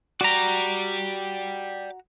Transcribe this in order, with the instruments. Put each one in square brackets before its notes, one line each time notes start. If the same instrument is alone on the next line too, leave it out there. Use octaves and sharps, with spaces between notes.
[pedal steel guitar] F#4 A#5 [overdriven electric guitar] G4 D5